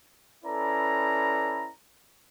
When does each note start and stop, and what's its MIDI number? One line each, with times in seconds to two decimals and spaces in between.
0.45 1.71 61
0.45 1.71 64
0.45 1.71 69
0.45 1.71 71
0.45 1.71 74
0.45 1.71 82